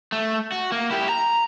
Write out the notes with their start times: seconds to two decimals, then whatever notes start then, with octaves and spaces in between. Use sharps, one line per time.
0.12 A3
0.52 F#4
0.72 A#3
0.91 E4 G4
1.09 A#5